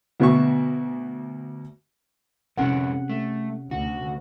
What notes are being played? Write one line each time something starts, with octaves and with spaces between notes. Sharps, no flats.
D2 B2 F#4 E5 C#6
F2 C3 C#4 A4 A#4 F#5
A3
D2 F#4